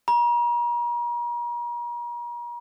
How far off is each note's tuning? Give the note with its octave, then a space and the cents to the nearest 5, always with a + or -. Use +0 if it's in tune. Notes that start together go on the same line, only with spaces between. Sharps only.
A#5 +40